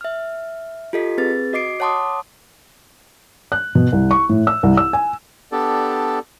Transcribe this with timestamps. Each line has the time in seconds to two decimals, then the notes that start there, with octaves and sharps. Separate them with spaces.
0.01 E5 F6
0.93 F4 G4 A4 D#5 B6
1.18 C4 G#4 B4 A6
1.53 F#4 D#5 D6 C7 D7
1.80 C#5 F#5 A5 C6 D6 D#6
3.52 F#6
3.75 B2
3.92 C2
4.11 C#6
4.29 A2
4.47 E6
4.63 C2
4.77 E6
4.93 G#5
5.52 B3 D4 G4 A4 D5